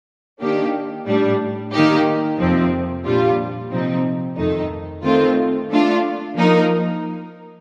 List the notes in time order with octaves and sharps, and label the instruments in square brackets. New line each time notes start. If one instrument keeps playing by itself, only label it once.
[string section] D#3 A#3 D4 G4
A2 G3 D4
D#3 A#3 D#4 G4
F2 C3 F3 C4
A#2 G3 D4 F4
C3 F3 C4 D#4
F2 D#3 A3 D#4
D#3 A3 C4 F4
A3 D4 F4
F3 A#3 D#4 A#4